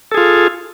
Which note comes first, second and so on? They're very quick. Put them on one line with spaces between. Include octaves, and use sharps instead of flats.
A4 G#4 F4